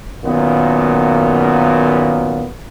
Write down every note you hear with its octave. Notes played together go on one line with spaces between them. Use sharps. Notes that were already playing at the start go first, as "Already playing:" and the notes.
F#2 A#2 D#3 A#3 B3